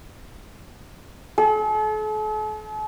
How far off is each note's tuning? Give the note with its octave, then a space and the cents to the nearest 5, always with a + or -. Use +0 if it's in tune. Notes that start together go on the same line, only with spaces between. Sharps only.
A4 -45